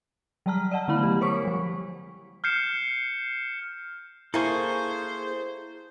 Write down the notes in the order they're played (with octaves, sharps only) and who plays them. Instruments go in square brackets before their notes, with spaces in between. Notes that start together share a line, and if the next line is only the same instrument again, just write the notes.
[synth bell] F#3 G3 D5 A5 A#5 F6
D5 D#5 F#5 A5
D3 A3 B3 E4 F5 B5
F#3 G4
A#4 C5 C#5 C#6 B6
F3 G3
[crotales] F6 G6 C7 C#7 E7
[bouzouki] A#3 G#4 [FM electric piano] E4 [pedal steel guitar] A4 C#6 [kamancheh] C5